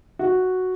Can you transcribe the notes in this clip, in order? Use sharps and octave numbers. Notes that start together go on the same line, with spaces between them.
F#4